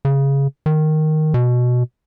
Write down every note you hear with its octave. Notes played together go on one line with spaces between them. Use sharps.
C#3
D#3
B2